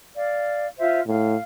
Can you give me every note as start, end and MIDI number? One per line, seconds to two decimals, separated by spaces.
0.14 0.66 74
0.14 0.66 77
0.77 0.98 65
0.77 0.98 72
0.77 0.98 76
1.06 1.36 45
1.06 1.41 77